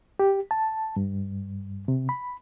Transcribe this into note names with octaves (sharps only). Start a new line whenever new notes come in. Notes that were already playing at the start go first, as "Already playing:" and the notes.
G4
A5
G2
C3
B5